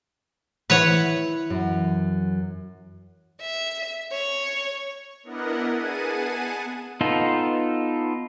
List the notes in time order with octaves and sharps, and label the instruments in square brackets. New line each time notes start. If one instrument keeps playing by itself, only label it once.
[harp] E3 [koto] B4 C#5 F#5
[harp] F#2
[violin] E5
C#5
[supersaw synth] B3 D4 E4 A#4 D#5 F#5
B3 G#4 F#5 G#5 A5 D#7
[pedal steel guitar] B3 D#4 F4 A4